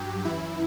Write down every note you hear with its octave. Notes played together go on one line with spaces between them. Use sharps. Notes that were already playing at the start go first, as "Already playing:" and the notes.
Already playing: G2 F#3 G4
F#2 E3 E4